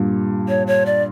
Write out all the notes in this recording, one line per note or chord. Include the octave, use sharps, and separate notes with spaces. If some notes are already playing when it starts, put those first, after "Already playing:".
Already playing: G2 A#2
C#5
C#5
D5